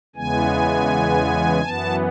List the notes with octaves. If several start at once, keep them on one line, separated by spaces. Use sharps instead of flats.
E2 C#3 E3 G#3 B3 G#5
F#2 E3 B3 A5